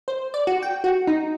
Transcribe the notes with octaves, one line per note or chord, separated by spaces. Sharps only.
C5
D5
F#4
G5
F#4
D#4